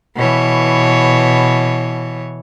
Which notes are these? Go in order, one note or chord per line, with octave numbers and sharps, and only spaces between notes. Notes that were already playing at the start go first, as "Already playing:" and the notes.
B2 E3 C#5